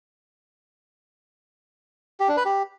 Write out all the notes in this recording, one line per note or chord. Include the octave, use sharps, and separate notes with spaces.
G4
D4
B4
G4